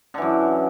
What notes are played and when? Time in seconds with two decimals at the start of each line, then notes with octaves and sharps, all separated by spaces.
0.14 D3
0.18 E3
0.22 F#2